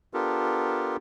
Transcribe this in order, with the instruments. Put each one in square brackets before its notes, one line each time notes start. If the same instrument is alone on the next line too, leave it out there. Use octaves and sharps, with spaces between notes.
[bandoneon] B3 D4 F4 G4 A4 A#4